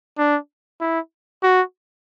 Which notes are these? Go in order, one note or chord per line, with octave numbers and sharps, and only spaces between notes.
D4
E4
F#4